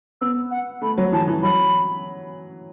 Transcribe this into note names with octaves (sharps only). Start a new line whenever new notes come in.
B3 E6
F#5
A3 B5
F#3
E3 A5
E3
F#3 B5